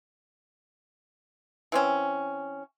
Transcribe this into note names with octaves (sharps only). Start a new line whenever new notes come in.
E3 C4 C#4